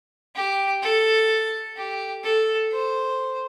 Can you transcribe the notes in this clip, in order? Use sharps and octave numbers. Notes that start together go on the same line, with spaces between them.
G4
A4
G4
A4
C5